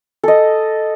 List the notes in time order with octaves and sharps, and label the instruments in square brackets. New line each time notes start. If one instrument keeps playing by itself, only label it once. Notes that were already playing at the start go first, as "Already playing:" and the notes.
[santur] A4 D#5